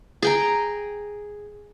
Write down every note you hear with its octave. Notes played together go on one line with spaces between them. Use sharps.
G#4 G5 A#5